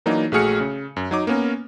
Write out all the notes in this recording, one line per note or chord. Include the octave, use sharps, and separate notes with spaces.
E3 F#3 A#3 D4 D#4
A#1 A3 F#4 G#4 F6 C#7
C#3
F#2
F#3 D#4 D6
A#3 B3 C#4 A#4